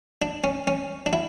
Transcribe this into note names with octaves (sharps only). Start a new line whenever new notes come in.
D4
C#4
C#4
D4
E4